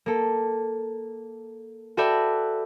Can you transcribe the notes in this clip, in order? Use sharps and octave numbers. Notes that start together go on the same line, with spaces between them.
A#3 A4
F#4 A4 B4 D5 E5 G5